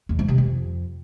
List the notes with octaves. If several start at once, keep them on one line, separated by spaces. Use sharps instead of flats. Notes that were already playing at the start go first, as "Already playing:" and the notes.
E2
G#2
C3
F2